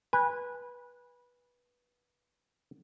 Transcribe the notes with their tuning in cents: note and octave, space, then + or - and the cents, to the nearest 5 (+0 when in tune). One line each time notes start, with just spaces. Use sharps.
B4 -15 G#5 -25